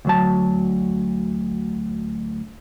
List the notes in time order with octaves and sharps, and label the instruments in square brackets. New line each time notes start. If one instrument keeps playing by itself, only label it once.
[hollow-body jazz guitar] D2 F#3 A5